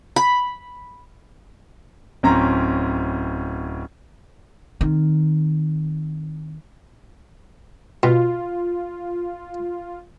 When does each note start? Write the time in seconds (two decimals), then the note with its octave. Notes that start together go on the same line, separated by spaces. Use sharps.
0.16 B5
2.23 D1 C4 C#4 A#5
4.81 D#3 C4
8.03 B2 F4